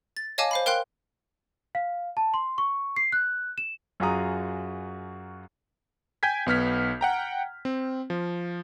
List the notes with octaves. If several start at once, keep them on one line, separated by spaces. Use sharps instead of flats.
A6
C#5 D#5 F5 G#5 A5 D6
C5 F5 B5
A#4 F5 G5 C6 F#6
F5
A5
C6
C#6
C7
F#6
E7
F#2 F4 F#4 G#4 A#5 D#6
G5 G#5 G6 G#6 B6
B1 B3 F6 B6
F#5 G5 A#5
C4
F3